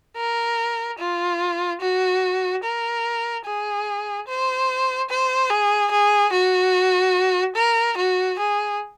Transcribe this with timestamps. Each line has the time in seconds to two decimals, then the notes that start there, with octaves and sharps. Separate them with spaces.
0.17 A#4
0.99 F4
1.81 F#4
2.63 A#4
3.46 G#4
4.27 C5
5.10 C5
5.50 G#4
5.92 G#4
6.33 F#4
7.56 A#4
7.97 F#4
8.38 G#4